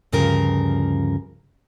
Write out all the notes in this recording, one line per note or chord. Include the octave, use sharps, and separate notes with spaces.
D2 G2 C#3 F3 A#4